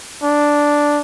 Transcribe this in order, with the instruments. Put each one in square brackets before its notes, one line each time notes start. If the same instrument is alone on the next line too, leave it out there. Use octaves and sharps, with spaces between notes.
[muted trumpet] D4